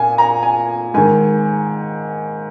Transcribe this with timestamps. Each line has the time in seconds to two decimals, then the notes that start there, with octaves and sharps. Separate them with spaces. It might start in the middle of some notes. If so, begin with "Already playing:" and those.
Already playing: A#2 G#5
0.18 A#5
0.43 G#5
0.94 G#2 D#3 G#5